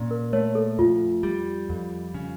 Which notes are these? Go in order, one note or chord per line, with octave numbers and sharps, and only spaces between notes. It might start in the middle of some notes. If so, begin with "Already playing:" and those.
Already playing: A#2 C#4
A#4
A3 C#5
A4
F2 F4
G3
F2
C#3